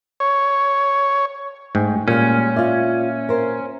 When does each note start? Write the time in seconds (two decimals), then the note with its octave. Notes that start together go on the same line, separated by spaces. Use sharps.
0.20 C#5
1.75 G#2 A3 G5 G#5
2.08 A#2 G3 G#3 C#4 F6
2.56 F4 D5 E5
3.29 A#4 C5